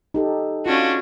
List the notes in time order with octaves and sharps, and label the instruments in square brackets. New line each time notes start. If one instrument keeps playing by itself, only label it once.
[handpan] D#4 G4 A4
[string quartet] C#4 D4 F#4 [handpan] F4